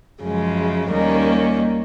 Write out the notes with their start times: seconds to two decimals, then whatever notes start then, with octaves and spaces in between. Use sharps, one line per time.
0.22 F#2 C#3 F3 G#3
0.90 D#2 D#3 G3 A#3 C#4